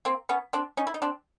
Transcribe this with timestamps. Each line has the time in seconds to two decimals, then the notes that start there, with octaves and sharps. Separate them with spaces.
0.05 A#3 C4
0.29 B3 C#4
0.53 C4 D4
0.77 C#4 D#4
0.87 E4
0.94 D#4
1.02 C4 D4